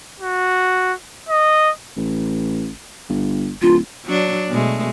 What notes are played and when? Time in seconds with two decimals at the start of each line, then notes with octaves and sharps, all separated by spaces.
0.20 F#4
1.29 D#5
1.96 A1
3.09 G1
3.62 D1 F4
4.06 F#3 D4
4.49 B2 G#3 A3